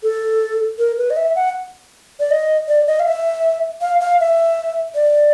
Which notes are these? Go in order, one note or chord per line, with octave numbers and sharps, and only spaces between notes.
A4
A#4
B4
D#5
E5
F#5
D5
D#5
D5
D#5
F5
E5
F5
F5
E5
D5